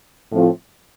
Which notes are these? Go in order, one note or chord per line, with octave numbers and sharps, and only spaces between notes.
A2 F3 A3 C4 F4